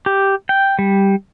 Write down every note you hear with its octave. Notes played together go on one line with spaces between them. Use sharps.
G4
G5
G3